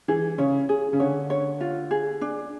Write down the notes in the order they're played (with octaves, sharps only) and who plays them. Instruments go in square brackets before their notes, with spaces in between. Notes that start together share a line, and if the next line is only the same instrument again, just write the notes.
[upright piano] E3 [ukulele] G#4
[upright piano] C#3 [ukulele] C#5
[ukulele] G#4
[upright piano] C#3
[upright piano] D3 [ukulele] C#5
[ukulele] C#5
F4
G#4
D4